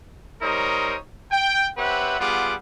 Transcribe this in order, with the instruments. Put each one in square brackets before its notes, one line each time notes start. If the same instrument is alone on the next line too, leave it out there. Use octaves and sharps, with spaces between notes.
[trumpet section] G3 D#4 A#4 C5 C#5 D#6
G5
C4 G4 B4 C#5 E5 F#5
G3 B3 F4 G#4 F#5 D6